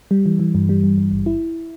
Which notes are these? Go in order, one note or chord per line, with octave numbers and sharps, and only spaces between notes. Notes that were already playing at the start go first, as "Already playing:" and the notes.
G3
E3
E3
G2
G3
G2
G2
G#1
E4